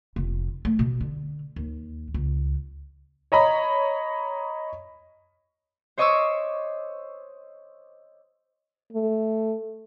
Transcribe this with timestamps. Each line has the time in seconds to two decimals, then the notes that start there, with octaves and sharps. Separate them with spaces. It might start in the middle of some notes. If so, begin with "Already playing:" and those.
0.16 F1
0.65 A3
0.79 B2
1.01 D3
1.56 D#2
2.14 C#2
3.32 C#5 D#5 A#5 B5
5.97 C5 C#5 D#5 C#6 D6 E6
8.92 A3